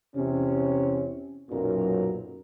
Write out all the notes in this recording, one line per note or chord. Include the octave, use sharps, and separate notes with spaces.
E2 C3 C#4
B1 F#2 A#2 A#4